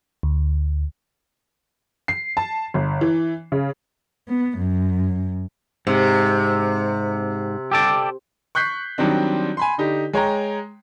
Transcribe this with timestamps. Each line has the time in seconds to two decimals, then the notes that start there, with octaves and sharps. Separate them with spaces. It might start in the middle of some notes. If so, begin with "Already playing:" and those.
0.23 D2
2.08 C7
2.37 A5
2.74 G1
3.01 E3
3.52 C#3
4.28 B3
4.58 F#2
5.87 G#2 C3
7.71 G4 A4 D5
8.55 C#6 F#6 G6 B6 C7
8.98 D#3 F#3 G3 C4 D4
9.57 G#5 B5 C6
9.78 D3 D#4 G4
10.13 G#3 C#5 G5 A#5